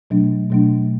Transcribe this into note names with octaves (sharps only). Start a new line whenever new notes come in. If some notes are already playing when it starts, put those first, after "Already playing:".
B2 F#3 A3 D4
B2 F#3 A3 D4